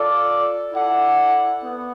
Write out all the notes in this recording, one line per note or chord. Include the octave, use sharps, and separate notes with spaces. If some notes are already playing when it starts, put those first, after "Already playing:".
Already playing: F4 A4 D5
E4 A4 D5 F#5
B3